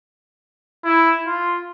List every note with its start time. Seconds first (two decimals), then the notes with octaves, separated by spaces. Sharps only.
0.85 E4
1.27 F4